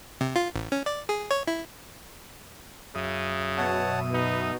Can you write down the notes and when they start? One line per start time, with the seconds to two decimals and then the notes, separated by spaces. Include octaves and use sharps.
0.21 C3
0.36 F4
0.55 A1
0.72 C#4
0.86 D5
1.09 G#4
1.31 C#5
1.48 E4
2.95 F#2 C#3 E5 D#6
3.58 B2 C#5 F#5 A5
4.13 D#4 B4